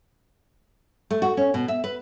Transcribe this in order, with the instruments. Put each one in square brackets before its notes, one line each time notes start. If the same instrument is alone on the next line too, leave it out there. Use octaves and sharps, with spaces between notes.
[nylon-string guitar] A3
F#4
C#4
B2
E5
B4